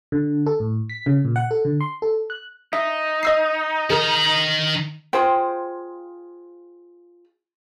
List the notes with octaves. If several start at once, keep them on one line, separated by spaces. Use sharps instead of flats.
D3
A4
A2
B6
C#3
A#2
F#5
A4
D3
C6
A4
F#6
D#4 E5
D#5 E6 C7
D#3 G#4 A#4 A#5
F4 G#4 C5 G5